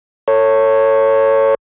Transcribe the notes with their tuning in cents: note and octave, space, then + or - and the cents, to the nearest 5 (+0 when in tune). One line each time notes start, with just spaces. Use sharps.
A4 +30 C#5 -5